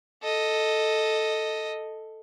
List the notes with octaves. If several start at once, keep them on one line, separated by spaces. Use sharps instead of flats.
A4 D#5